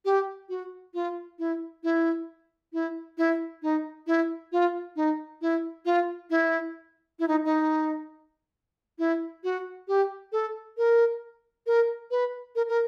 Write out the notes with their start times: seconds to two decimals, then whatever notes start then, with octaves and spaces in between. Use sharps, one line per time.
0.05 G4
0.49 F#4
0.94 F4
1.39 E4
1.83 E4
2.73 E4
3.18 E4
3.62 D#4
4.07 E4
4.52 F4
4.96 D#4
5.41 E4
5.85 F4
6.30 E4
7.19 E4
7.28 D#4
7.45 D#4
8.99 E4
9.44 F#4
9.88 G4
10.32 A4
10.77 A#4
11.66 A#4
12.11 B4
12.55 A#4
12.69 A#4